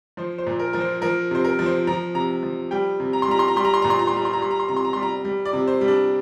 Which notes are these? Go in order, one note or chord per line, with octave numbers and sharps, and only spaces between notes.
F3 C5
C5
A#2
A#4
F3 A#4
C5
F3 A#4
C3 C5
A#4
F3
C5
F3 A#5
C3 A#5
F3
G3 G5
C3
A#5
C6
G3 A#5
C6
A#5
G3 C6
A#5
C6
A#2 A#5
C6
A#5
C6
G3 A#5
C6
A#5
G3 C6
A#5
C6
C3 A#5
C6
A#5
G3 C6
A#5
G3
D5
C3
C5
G3
D4